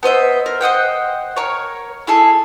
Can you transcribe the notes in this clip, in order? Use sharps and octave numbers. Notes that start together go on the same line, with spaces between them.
B3 C5 D#5 E5
A#4
C5 D#5 F#5 G5
A#4 C#5
E4 G#4 A4